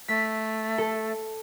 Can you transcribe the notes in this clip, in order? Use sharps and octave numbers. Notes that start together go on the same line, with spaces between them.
A3 B6
A4